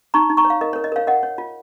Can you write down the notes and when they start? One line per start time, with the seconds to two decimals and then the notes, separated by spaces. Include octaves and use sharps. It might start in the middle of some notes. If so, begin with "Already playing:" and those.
0.14 D#4 A#5 C#6
0.30 D#4
0.37 A#5 C#6
0.45 C#5
0.50 F5
0.61 A#4 D#5
0.73 A#4 C#5
0.84 D#5
0.92 A#4 C#5 F5
1.07 A#4 D#5 F#5
1.23 C#5
1.38 F4